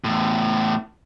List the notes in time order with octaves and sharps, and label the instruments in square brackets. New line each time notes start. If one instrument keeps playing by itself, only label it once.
[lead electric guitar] E2 A2